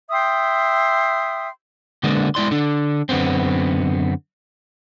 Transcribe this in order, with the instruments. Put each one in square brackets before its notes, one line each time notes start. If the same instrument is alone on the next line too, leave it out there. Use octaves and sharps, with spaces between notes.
[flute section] E5 G5 C6 D#6
[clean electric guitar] D3 G#3 A#3 B3 D4
G#3 E4 D5 C6
D3 D4
F#2 D3 B3 C4